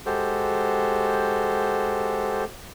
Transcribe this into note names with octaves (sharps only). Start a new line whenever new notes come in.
G#3 F#4 G4 A4 C5